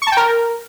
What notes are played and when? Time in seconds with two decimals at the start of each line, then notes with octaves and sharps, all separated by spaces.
0.02 C#6
0.07 A5
0.12 G5
0.17 A#4